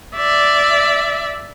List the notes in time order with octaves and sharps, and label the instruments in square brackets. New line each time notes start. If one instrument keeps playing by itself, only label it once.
[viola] D5 E5